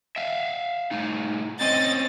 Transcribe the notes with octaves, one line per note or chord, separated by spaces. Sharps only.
E5 F5
A2 D#4
C4 C#4 C5 D#5 A6